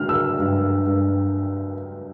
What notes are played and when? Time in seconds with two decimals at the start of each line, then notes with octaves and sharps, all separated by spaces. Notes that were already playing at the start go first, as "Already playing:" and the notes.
Already playing: D3 F#3 F6
0.09 E6
0.40 G2
0.86 G2